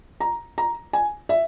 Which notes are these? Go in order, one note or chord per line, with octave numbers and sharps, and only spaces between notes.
A#5
A#5
G#5
E5